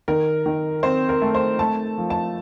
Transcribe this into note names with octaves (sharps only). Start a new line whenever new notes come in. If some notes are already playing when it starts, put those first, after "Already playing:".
D#3 A#4
D#3
C4 C5
A#4
A3
C5
A3 A5
F3
A5